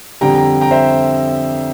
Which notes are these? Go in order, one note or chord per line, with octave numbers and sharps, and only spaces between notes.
F2 D3 G3 G5 A#5
G5 A#5
G5 A#5
C5 E5